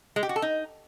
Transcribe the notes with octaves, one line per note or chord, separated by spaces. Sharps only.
G#3
G4
F#4
A4
D#4